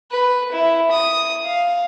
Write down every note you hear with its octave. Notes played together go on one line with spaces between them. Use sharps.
B4
E4
D#6
F5